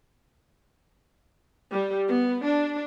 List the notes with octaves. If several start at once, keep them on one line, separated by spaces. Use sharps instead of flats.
G3
B3
D4